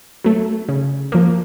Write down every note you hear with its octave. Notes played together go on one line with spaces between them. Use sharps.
F#3 A3
C#3
F3 A#3